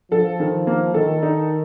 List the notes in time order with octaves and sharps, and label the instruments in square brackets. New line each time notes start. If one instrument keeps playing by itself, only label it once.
[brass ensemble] F3 [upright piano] A4
[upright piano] D#3
A#3
[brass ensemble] D#3 [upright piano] A4
[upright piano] D#4